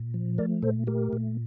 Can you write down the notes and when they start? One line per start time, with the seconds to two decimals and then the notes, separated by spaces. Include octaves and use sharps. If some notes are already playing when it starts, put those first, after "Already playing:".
Already playing: A#2
0.14 F3
0.38 A3 A#4 D5
0.63 A#2 A4 C5
0.87 A3 G4 A#4
1.13 A#2